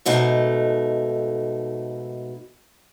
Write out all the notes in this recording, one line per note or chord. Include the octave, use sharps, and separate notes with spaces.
G#2 B2 A3 D#4